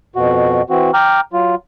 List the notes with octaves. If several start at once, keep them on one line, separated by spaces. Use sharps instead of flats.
F2 B2 F#4
E3 C4 F#4
G5 A#5 D6 F6
F#3 F4